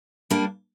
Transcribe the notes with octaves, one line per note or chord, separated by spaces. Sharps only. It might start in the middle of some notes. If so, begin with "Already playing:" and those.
G3 A#3 D4